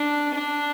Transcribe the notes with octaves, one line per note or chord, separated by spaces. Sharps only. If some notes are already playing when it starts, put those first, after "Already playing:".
Already playing: D4
D4